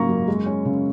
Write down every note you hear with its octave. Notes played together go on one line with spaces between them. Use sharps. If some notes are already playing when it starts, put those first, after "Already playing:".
Already playing: G#2 C#3 F#3 A#3 A#5 C#6
F#2
G#3
C#4
C#3